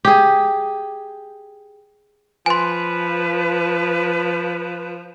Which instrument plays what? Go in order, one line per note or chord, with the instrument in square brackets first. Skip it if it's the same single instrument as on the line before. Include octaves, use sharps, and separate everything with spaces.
[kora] G4 G#4
[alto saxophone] F3 [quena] B4 [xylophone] G#5 C6